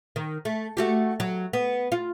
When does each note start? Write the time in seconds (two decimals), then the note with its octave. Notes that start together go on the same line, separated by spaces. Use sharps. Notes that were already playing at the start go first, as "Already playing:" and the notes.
0.16 D#3
0.45 A3
0.77 A3 F#4 G4
1.20 F#3
1.53 B3
1.92 F4